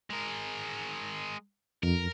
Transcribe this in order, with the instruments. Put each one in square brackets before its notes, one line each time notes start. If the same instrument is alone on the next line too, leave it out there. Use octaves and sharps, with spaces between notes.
[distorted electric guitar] G#3 A#4
[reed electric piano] F2 [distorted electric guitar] A#4